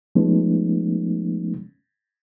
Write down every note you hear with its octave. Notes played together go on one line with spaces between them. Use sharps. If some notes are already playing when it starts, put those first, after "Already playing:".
F3 G#3 A3 B3 C#4 D#4